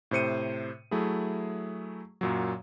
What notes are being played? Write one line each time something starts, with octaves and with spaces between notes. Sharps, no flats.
A2 C3 C5 C#7 D#7
F#3 A3 E4 G#4
F#2 A#2 F#3